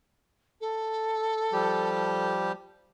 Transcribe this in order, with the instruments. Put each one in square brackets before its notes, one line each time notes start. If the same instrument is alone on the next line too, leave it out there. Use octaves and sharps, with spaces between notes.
[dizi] A4
[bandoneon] F3 G3 G4